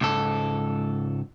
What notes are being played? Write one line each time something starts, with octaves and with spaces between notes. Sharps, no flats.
C#2 G#2 A4